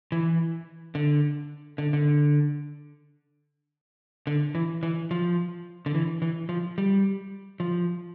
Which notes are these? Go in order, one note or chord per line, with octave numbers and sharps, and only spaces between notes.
E3
D3
D3
D3
D3
E3
E3
F3
D3
E3
E3
F3
G3
F3